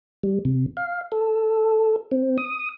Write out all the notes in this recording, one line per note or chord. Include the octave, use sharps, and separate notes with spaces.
G3
C3
F5
A4
C4
D#6